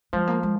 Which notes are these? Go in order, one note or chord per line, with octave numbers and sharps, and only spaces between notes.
F3 G#3
A#3
G#3